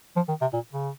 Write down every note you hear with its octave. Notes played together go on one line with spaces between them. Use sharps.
F3
D#3
C3
A#2
C#3